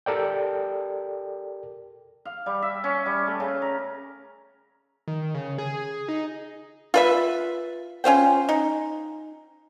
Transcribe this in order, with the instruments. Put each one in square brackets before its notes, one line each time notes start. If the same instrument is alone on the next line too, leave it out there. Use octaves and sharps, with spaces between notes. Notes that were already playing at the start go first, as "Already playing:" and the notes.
[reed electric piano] G4 A4 A#4 D5 G5
[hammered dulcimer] F5
G3
E5
C#4
G3
A3
C#3
A#4
[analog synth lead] D#3
C#3
G#4
D#4
[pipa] F4 B4 E5
C#4 F4 C5 G5
D#4